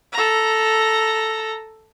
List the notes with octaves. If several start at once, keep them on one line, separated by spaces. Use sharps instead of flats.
A4 A#5